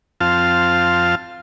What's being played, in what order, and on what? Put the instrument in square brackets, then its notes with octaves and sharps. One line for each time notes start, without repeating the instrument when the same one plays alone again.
[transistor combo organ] F2 C4 F4 F5 A5